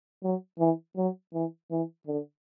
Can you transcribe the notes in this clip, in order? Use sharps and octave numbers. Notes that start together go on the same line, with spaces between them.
F#3
E3
F#3
E3
E3
D3